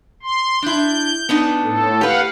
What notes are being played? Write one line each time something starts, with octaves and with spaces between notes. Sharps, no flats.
C6
D4 E4 G6
B3 D4 D#4
A2 A4
G4 B4 F5 F#5